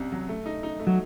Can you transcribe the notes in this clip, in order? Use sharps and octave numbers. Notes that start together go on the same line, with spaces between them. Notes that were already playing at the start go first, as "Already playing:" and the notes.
Already playing: C2 C3 C#4
F#3
A3
D#4
D#4
A3
F#3